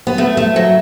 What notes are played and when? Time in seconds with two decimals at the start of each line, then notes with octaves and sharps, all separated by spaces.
0.07 B3
0.18 A3
0.37 A3
0.56 F#3